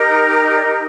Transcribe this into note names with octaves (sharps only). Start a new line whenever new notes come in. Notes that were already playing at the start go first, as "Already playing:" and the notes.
Already playing: D#4 G4 A#4
D5